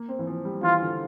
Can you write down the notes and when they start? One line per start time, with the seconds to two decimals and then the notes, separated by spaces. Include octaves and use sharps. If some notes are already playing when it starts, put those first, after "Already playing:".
Already playing: A#3
0.09 C4
0.19 E3
0.27 F3
0.45 G3
0.63 E3 F4
0.82 D3